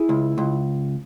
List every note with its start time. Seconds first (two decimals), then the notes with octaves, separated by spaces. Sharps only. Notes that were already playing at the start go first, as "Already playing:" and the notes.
Already playing: E4 G#4
0.09 C#2
0.38 C#2